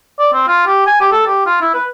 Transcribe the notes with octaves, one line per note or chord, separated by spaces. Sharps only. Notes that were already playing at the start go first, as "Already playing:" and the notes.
D5
C4
F4
G4
G#5
G4
A4
G4
F4
E4
B4